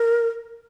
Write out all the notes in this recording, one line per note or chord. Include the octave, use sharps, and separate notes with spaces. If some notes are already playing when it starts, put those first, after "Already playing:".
Already playing: A#4